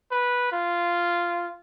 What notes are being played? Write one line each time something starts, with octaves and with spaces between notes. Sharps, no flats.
B4
F4